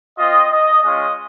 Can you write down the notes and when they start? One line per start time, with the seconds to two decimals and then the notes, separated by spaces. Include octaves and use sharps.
0.18 C4 F4 D#5
0.50 D#5
0.83 G#3 C#4 F4 D#5